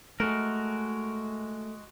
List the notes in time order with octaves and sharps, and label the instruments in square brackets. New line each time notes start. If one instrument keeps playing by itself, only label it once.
[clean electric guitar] G#3 F#4 A#4 [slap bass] A3